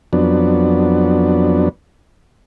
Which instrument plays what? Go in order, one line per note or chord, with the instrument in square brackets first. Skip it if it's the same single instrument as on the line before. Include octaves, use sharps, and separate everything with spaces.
[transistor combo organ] F2 F#3 B3 D4